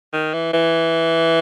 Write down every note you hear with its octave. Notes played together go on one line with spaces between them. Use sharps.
D#3
E3
E3